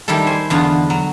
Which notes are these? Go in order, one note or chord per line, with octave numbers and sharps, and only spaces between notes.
D#3 G3 E4 G4 A4
C5 G#5
E2 D3 B3 F4
F#3